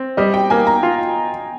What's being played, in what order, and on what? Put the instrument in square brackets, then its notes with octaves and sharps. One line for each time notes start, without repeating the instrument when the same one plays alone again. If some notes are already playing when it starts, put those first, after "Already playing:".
Already playing: [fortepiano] C4
[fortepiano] G3 [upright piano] D#5
[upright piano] G5
[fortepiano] A#3 [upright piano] G#5
[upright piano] A#5
[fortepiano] F4